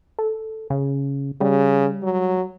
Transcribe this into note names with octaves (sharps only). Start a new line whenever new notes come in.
A4
C#3
C#3 G3
F#3